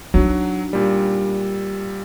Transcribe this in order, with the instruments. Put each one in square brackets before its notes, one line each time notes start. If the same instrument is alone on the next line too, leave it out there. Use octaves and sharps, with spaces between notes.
[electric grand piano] F#3 [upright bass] D4 D#4
[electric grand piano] A#2 G3